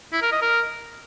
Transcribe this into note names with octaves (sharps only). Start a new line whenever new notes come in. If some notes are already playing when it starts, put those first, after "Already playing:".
E4
A#4
D#5
A#4